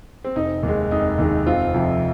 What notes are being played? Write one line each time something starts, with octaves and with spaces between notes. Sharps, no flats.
C4
F1 D#4
D#2 D#3 G#3
F1 D#4
D#2 D#3 G#3
F1 C4 F4
F2 C3 F3